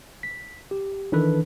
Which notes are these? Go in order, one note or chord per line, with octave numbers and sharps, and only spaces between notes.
B6
G4
D#3 E3 D4 A4 B4